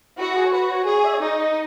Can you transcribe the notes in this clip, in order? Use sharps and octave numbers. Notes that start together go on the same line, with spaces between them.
E4 F#4
G#4
C#5
F#4 B4
C#5
G#4 C#5
E5
C#5
D#4 D#5
D#5